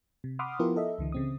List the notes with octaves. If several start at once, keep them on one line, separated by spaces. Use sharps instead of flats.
C3
F#5 B5 C6 D6 D#6 F6
F3 B3 E4 F4 G4 A#4
A4 D#5 E5
C#2 D3 E3
C#3 C4 D#6